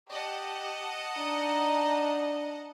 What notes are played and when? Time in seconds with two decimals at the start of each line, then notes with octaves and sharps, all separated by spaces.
0.11 G4 D#5 F#5 A5
1.18 D4 D#4